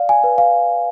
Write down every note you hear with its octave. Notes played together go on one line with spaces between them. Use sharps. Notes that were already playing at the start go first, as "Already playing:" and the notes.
Already playing: D5 F5
G#5
B4
F5